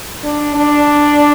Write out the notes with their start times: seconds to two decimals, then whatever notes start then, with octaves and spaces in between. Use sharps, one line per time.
0.24 D4
0.55 D4